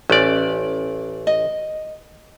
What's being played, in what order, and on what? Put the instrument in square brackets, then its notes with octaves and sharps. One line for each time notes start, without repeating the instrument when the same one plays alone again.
[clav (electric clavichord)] A1 D5 [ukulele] C#4
[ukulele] D#5